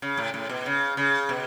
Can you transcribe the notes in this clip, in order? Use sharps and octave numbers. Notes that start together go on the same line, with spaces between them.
C#3
A2
A2
B2
C#3
C#3
B2